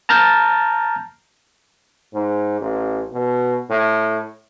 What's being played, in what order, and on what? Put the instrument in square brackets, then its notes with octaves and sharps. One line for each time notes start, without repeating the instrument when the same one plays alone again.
[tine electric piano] A5 A#5 F6 G6 A6
[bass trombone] G#2
A1
B2
A2